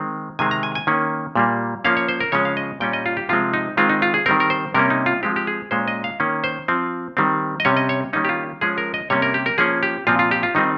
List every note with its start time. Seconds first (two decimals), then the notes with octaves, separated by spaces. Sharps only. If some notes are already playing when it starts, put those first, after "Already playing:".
Already playing: D#3 G#3 C4
0.39 C3 D#3 G#3 C4 G#5
0.51 A#5
0.63 G#5
0.75 G#5
0.87 D#3 A#3 C#4
1.36 A#2 G3 A#3
1.85 F3 A#3 C#4 F5
1.97 C#5
2.09 C5
2.20 A#4
2.32 C#3 F3 G#3 C#4 C#5
2.45 F5
2.57 D#5
2.80 A#2 G3 C#4 G5
2.93 D#5
3.06 F4
3.17 G4
3.29 C3 F3 G#3 C4 F4
3.54 D#4
3.77 D#3 G#3 C4 F4
3.89 D#4
4.02 F4
4.14 G#4
4.26 D#3 G3 C4 A#4
4.40 A#4
4.50 C5
4.74 C3 G3 A#3 C#4 A#4
4.90 D#4
5.06 F4
5.23 F3 G#3 C4 G4
5.36 G4
5.47 G#4
5.71 A#2 G#3 C#4 C5
5.88 D#5
6.04 F5
6.20 D#3 A#3 C#4
6.44 C5
6.68 F3 C4
7.17 D#3 G3 C4
7.60 D#5
7.65 C3 G3 C#4 C#5
7.77 D#5
7.89 C#5
8.13 D#3 G3 A#3 C#4 D#4
8.25 G4
8.29 F4
8.61 F3 G#3 C#4 G#4
8.78 A#4
8.94 D#5
9.10 C3 G3 A#3 C#4 C#5
9.22 A#4
9.34 G4
9.46 A#4
9.58 F3 A#3 C#4 G#4
9.83 G4
10.07 A#2 F3 C4 F4
10.19 F4
10.31 G4
10.43 F4
10.55 D#3 G3 C4 D#4